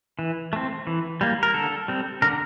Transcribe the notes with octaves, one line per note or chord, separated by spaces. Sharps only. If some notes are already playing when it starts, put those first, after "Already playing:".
E3
A3 C4
E3
G3 A#3
A#4
D3 A4
G3 C4
D3 A#4